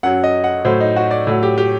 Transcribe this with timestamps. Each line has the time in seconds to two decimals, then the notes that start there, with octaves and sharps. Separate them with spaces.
0.03 F#2 F#3 F#5
0.24 D#5
0.44 F#5
0.65 A2 F#3 C5
0.81 D#4
0.96 F#4
1.11 D5
1.27 A2 F#3
1.43 G4
1.58 G4